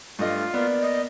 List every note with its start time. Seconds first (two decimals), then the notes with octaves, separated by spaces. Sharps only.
0.19 G2 A3 F4 D#5
0.54 A#3 B3 D5
0.82 D#5